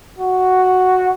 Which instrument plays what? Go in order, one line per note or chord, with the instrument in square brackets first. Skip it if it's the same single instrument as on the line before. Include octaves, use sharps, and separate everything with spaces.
[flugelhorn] F#4